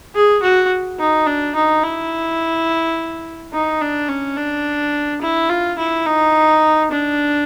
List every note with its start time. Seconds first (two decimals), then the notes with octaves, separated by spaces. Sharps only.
0.15 G#4
0.42 F#4
0.99 D#4
1.27 D4
1.56 D#4
1.84 E4
3.53 D#4
3.81 D4
4.09 C#4
4.37 D4
5.22 E4
5.50 F4
5.78 E4
6.06 D#4
6.91 D4